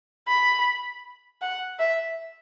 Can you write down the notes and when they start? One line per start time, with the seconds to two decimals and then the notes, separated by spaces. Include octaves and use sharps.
0.28 B5
1.41 F#5
1.79 E5